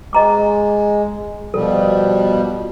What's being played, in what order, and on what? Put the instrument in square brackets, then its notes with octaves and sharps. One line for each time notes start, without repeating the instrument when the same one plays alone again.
[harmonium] G#3 [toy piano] D#5 A#5 D6
[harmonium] B2 F3 G3 [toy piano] A4